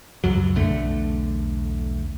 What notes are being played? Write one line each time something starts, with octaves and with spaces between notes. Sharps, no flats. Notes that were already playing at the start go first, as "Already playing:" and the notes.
C#2 F#2 F#3
B1 E2 D3 A3